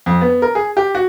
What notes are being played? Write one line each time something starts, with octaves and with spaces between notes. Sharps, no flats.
F2
B3
A#4
G#4
G4
F#4